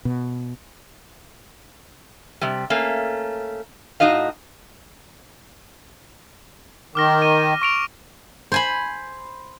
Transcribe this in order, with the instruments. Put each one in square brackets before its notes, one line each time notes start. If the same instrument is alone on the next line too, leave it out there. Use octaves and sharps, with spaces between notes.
[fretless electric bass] B2
[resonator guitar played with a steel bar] C3 G3
A3 A#3 C#4 F5
A2 D#4 F#4 D#5 F5
[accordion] D#3 [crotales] D6 F6 A#6
[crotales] D#7
C#6 D7 F7
[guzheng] C5 G#5 B5